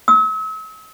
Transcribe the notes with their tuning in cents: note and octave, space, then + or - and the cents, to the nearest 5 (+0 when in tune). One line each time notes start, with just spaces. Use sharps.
E6 -40